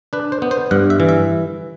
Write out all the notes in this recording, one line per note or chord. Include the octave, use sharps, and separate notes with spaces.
D4 B4
C5
B3
C5
G2 F#5
E5
E3
E5